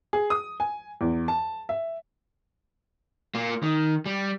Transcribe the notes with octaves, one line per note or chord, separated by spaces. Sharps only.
G#4
D#6
G#5
E2
A5
E5
A#3 F4
D#3
G3